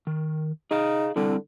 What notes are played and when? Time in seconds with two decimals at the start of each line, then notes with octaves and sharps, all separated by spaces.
0.07 D#3
0.71 D#4 G#4 F5
1.16 D3 G3 C4 E4